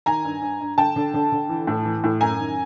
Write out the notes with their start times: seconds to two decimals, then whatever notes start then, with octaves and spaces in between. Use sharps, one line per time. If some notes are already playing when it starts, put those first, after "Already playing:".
0.06 D#3 G#5 A#5
0.25 G2
0.42 G2
0.61 G2
0.78 D3 G5 A5
0.96 D3
1.14 D3
1.32 D3
1.49 E3
1.67 A2
1.85 E3
2.04 A2
2.21 F#2 G#5 A#5
2.39 D#3